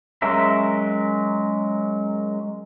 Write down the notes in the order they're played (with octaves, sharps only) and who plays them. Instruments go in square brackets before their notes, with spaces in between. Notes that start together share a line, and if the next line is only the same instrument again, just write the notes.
[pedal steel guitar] F#3 G#3 C#4 A#4 E5